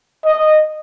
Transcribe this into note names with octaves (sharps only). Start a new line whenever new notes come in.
D#5